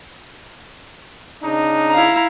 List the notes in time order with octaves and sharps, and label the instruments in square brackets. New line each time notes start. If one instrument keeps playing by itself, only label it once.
[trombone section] C#3 D4 D#4
[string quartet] E4 F5 A#5